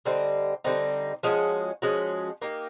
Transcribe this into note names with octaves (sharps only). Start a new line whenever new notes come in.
D3 G3 C4 D#4
D3 G3 C4 D#4
F3 G#3 C#4 F#4
F3 G#3 C#4 F#4
A#3 D#4 G4